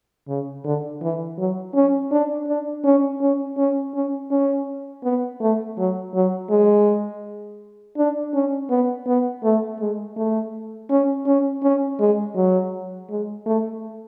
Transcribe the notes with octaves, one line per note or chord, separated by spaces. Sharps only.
C#3
D3
E3
F#3
C#4
D4
D4
C#4
C#4
C#4
C#4
C#4
B3
A3
F#3
F#3
G#3
D4
C#4
B3
B3
A3
G#3
A3
C#4
C#4
C#4
G#3
F#3
G#3
A3